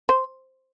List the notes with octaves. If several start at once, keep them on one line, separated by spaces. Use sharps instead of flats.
C5